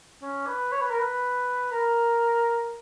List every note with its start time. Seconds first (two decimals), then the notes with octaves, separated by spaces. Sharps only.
0.22 C#4
0.47 B4
0.72 C#5
0.81 B4
0.90 A#4
0.99 B4
1.72 A#4